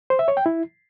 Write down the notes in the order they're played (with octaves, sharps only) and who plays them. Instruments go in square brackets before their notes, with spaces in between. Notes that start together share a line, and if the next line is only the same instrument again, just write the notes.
[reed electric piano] C5
E5
C#5
G5
E4